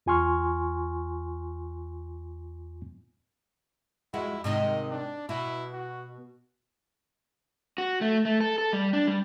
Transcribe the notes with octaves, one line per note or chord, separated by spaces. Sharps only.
E2 F4 G#5 C6 C#6 F6
F2 G#3 E4 F#4
G#2 C3 D#3 D#5
D4
B2 E4
F#4
F#4
A3
A3
A4
A4
G3
D4
G3